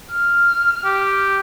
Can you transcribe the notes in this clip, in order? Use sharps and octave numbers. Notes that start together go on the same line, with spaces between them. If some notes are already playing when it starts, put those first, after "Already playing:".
F6
G4